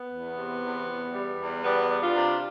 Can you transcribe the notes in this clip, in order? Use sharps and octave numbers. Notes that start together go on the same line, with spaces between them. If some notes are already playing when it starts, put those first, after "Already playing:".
Already playing: B3
E2
C3
E2
E2
G3
E2
G3 B3
G3
D4 F4
C3